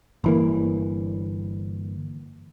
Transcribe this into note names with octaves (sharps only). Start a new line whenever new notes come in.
G1 E3 A#3